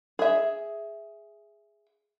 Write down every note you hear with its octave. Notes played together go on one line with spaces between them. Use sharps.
G#4 E5